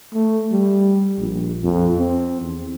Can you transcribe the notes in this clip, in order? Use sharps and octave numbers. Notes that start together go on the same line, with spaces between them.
A3
G3
A#1
F2
C4
E2